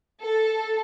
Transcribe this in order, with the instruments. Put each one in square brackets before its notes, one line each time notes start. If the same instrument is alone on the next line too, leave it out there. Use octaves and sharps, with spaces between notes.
[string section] A4